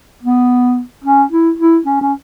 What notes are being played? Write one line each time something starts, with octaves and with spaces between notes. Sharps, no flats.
B3
C#4
E4
E4
C#4
C#4